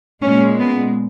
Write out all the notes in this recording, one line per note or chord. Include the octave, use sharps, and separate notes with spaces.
A#2 G#3 C#4
B3